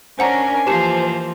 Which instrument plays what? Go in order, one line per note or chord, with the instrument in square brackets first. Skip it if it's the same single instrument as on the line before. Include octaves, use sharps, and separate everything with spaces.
[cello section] C#4 D4 A#4 [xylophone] C5 F#5 A#5 [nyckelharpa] G#5
[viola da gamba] E3 F3 A#3 [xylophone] G4 A5 [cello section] C5